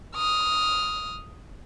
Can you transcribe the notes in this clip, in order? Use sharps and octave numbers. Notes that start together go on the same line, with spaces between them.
D#6 F6